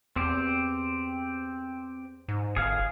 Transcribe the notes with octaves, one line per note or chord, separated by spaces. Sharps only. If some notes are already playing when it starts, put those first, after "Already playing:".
E2 C4 G4
G#2
G1 G#4 F5